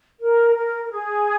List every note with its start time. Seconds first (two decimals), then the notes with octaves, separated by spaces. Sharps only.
0.20 A#4
0.55 A#4
0.83 A#4
0.90 G#4